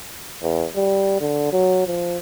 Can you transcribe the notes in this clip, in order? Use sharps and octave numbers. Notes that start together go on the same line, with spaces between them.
E2
G3
D3
F#3
F3